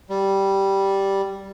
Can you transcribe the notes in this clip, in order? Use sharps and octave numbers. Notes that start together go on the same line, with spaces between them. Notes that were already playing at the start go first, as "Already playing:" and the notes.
G3